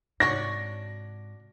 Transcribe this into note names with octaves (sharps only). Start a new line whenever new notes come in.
G#2 C3 D4 F#4 C#5 A#6